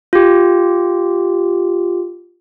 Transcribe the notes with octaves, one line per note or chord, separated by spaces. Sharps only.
F4 G4